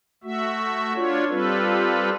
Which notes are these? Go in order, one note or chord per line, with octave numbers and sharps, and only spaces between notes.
A3 F#4 E5
D4 F4 C#5
G3 C4 F4 A4 B4